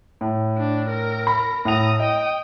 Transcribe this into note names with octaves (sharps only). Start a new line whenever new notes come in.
A2
D4
A#4 A#5
B5
A2 F#5 A#5 D#6 F7
D#5 G5 D#6